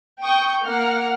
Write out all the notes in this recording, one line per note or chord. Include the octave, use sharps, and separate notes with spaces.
G5 C#6 D#6 G6
A#3 F#5 F6